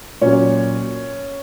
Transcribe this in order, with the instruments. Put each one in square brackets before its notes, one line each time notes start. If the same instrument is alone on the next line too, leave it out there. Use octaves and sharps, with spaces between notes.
[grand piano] A#2 F#3 C#4